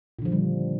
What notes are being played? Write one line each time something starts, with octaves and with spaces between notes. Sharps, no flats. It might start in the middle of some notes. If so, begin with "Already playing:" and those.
A#2 D3 D#3 F3 G3